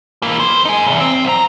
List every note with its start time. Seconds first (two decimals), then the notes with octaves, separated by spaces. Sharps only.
0.22 E3 A#3
0.40 F2 C5
0.65 D#4 G#4
0.87 B1 E2
1.00 C4
1.25 B1 A#5